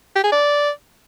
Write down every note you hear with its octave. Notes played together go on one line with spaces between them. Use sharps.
G4
G#4
D5